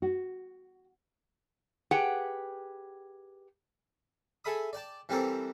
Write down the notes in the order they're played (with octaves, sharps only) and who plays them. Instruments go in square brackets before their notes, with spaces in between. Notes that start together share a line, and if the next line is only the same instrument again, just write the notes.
[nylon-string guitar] F#4
[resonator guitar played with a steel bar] G4 G#4 B4 F#5 G5
[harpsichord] G#4 A4 E5 B5 D#6
D5 G5 A5
E3 G3 C4 A4 A#4 C5